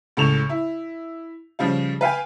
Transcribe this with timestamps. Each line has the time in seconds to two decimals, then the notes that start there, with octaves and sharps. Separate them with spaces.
0.17 C#2 A2 F7
0.49 E4
1.59 C#3 F3 G3 F4
2.01 B4 F5 G5 G#5